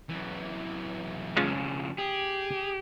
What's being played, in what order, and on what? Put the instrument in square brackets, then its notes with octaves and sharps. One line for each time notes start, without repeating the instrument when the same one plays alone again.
[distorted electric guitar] F#2 E3
[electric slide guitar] F2 C#3 F3 [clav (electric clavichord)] G#3 C#4 F4
[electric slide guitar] G4 [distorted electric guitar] G#4